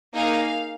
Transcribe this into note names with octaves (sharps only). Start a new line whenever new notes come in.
A#3 D#4 G#4 F5